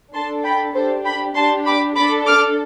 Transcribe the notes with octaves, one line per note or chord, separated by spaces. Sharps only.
D4 A4 A5 C6
G5 B5
D4 G4 A4 C5
G5 B5
D4 G4 A5 C6
B5 D6
D4 A4 B5 D6
D6 F6